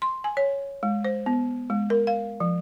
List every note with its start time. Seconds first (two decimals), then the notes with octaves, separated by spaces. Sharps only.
0.02 C6
0.24 G#5
0.37 C#5
0.83 G#3
1.05 C5
1.26 B3
1.70 G#3
1.90 A#4
2.07 F5
2.40 F3